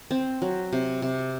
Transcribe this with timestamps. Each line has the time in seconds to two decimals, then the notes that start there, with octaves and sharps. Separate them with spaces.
0.11 C4
0.42 F#3
0.73 C3
1.02 C3